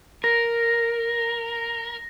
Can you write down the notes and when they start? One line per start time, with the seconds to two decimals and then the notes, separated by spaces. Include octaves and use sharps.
0.24 A#4 A#6